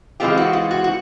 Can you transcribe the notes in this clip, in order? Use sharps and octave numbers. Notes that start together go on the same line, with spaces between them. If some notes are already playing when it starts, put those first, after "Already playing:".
E3 G#3 C4 F4 G4
F#4
F4
F#4
F#4